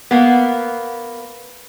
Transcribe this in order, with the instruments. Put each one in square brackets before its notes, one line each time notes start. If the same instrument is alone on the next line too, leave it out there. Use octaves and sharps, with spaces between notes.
[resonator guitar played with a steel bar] A#3 B3